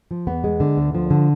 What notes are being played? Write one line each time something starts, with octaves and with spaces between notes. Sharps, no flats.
F3
E2 B3
G#3
D3
D2
F3
D3